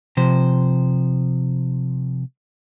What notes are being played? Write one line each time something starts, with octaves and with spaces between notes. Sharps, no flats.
C3 F3 C5